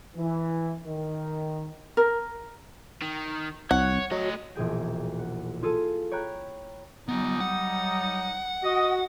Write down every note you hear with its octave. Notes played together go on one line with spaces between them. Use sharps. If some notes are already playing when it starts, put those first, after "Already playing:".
E3
D#3
A#4
D#3
C2 C#5 F#5
F#3 A3 D#5
E1 A#1 G#4 G5
F#5
F4 G#4 A4 D#7
C#5 G5 A#5 B5 F#6
F#3 G3 B3 D#4 F4
F#5
F#4 D#5